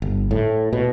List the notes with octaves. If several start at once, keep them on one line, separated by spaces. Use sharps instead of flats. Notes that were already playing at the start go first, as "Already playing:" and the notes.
G1
A2
B2